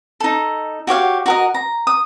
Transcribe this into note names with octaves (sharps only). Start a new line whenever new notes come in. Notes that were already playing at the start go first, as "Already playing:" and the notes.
D#4 A4
F#4 G4 C#5 F5
F#4 A#4 D#5
A#5
D#6